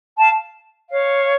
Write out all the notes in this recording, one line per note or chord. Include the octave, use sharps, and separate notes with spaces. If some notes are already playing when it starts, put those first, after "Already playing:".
F5 A5
C#5 F5